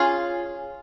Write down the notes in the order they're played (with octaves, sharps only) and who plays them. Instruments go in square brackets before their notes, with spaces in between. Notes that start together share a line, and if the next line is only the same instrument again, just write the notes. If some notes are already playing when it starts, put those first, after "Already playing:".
Already playing: [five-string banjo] C#4 F4 G#4